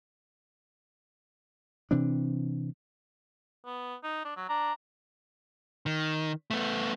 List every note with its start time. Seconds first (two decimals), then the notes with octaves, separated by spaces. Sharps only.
1.91 C3 E3 C4 D4
3.65 B3
4.04 D#4
4.25 D4
4.36 F#3
4.49 D4 A#5
5.86 D#3
6.51 A3 B3